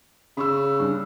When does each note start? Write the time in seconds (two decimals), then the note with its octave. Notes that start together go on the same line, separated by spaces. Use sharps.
0.37 C#3 B5 C#6 E6
0.80 G2